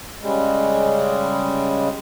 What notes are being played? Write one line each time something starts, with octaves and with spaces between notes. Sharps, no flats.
C#3 G3 G#3